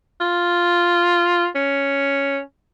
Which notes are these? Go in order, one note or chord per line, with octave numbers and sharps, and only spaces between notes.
F4
C#4